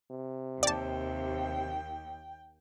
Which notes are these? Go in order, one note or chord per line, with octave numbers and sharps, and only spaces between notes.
C3
D#2 D5 G5 A5